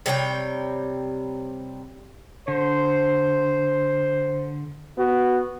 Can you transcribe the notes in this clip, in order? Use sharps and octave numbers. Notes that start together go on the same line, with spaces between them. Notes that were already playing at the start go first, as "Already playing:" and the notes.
C3 G3 C#5 G5
D3 C5
B3 F#4